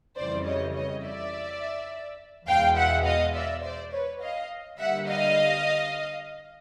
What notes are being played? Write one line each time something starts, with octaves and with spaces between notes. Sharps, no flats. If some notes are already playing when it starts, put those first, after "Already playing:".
F2 C#3 E3 G3 C5 D5
C#5 D#5
C#5 D#5
D5 E5
E2 B2 G#3 F5 G5
E5 F#5
D#5 F5
D5 E5
C5 D5
B4 C#5
D#5 F5
D3 G3 A#3 E5 F#5
D#5 F5